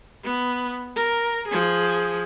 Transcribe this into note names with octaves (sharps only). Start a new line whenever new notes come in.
B3
A#4
F3 G#4